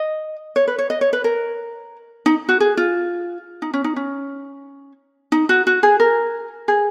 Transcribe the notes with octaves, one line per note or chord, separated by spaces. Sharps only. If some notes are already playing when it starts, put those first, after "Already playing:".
Already playing: D#5
C#5
B4
C#5
D#5
C#5
B4
A#4
D#4
F#4
G#4
F4
D#4
C#4
D#4
C#4
D#4
F#4
F#4
G#4
A#4
G#4